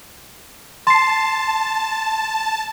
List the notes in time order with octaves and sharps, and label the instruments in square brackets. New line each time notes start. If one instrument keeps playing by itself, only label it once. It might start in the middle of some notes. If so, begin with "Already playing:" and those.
[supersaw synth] A5 [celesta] C6 C7